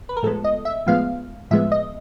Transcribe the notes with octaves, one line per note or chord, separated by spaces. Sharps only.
B4
A#4
A2 F3 G#3 B3 A4
D#5
E5
A2 F3 G#3 B3 F5
A2 F3 G#3 B3 E5
D#5